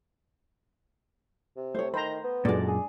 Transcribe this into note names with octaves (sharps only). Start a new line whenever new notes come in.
C3
A3 C5 C#5
D#3 C5 A#5 B5
B3
F#2 A#2 G#3 D4 F#4 A4 D5
G#4